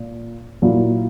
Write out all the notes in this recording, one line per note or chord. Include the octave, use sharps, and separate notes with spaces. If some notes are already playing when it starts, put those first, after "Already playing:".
Already playing: A#2
A#2 F#3 A#3 E4